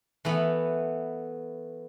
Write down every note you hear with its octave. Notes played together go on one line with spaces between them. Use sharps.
E3 A3 B3